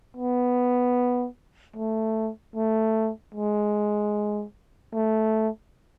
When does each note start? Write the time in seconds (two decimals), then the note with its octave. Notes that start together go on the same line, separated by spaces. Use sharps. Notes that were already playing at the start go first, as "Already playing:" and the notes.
0.17 B3
1.76 A3
2.56 A3
3.35 G#3
4.93 A3